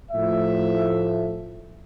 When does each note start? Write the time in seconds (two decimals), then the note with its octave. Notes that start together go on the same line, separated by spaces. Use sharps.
0.12 A2 F3 A3 E5